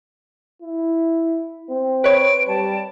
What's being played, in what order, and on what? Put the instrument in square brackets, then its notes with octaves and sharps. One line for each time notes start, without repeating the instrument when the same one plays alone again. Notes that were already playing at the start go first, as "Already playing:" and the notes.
[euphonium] E4
C4
[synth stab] B4 C#5 [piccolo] D7
[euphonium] G3 [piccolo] A5